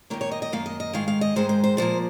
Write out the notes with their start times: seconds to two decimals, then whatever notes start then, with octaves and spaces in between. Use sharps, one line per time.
0.10 F#2 D#3 A#3 C#5
0.21 C#5
0.31 D#5
0.42 D#5
0.52 F#2 D#3 A#3 F5
0.66 D#5
0.80 D#5
0.93 G#2 D#3 G#3 F5
1.08 F5
1.21 D#5
1.36 G#2 D#3 G#3 C5
1.49 C5
1.64 C5
1.77 A#2 F3 A#3 C5